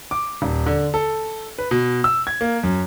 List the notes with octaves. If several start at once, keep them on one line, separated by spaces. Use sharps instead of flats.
D6
D#1
D3
A4
B4
B2
E6
G#6
A#3
F#2